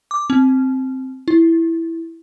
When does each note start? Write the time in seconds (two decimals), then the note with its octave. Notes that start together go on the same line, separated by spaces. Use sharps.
0.11 D6
0.30 C4
1.28 E4